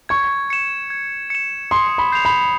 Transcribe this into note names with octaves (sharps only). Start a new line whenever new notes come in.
C#6 G#6
C#7 E7
G#6
C#7 E7
C6 D#6
B5
G6 C7 F7
B5